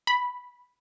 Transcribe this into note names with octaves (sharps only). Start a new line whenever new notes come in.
B5